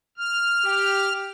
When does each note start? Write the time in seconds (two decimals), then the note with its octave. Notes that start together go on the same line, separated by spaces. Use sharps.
0.18 F6
0.65 G4